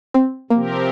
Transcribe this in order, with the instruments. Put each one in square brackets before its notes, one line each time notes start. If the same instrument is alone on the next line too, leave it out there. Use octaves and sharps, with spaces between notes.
[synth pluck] C4
[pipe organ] C3 F3 C4 G4 A#4 [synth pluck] A#3